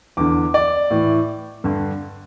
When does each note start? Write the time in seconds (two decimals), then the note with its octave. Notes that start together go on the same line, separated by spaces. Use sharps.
0.17 E2 D3 D6
0.54 D5
0.90 A2 E3
1.64 G2 D3